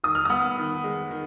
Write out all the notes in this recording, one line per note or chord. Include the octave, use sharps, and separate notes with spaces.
D#3 D#6
F6
B3 D#6
D#3
G#3
D#3